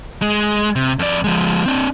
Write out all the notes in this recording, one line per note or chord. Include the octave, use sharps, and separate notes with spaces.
G#3
C3
F2 D5
F3 G#3
C4 D4